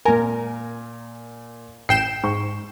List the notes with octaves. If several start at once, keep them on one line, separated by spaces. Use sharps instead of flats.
A#2 A#4 G#5
A1 G5 C7 E7
G#2 C#6